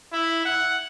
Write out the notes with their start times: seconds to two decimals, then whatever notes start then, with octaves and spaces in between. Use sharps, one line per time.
0.13 E4
0.45 F#5